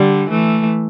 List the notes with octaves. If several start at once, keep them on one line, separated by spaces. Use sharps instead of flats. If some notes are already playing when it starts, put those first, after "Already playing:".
Already playing: D3 G3
E3 A3